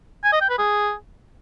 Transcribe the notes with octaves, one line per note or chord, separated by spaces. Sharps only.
G#5
D#5
G5
B4
G#4